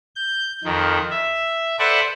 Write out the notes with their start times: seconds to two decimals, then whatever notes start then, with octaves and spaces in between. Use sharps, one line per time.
0.16 G6
0.64 F2 D#3
1.11 E5
1.79 A4 B4 C5 D5 E5 F#5